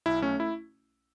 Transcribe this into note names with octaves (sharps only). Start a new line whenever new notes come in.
B1 E4
A3 C#4
E4